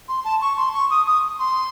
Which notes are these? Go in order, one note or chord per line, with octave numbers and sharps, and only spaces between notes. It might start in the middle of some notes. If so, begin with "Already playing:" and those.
C6
A5
C#6
C6
C#6
D#6
D#6
C6